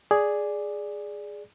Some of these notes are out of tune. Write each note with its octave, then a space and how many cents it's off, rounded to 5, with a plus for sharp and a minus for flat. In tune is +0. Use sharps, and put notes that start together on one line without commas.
G#4 +0 D5 +0